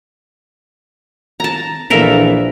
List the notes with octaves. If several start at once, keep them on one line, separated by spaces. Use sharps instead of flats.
A5 A#5
A#1 E3 A4 A#4 E5 F5 B6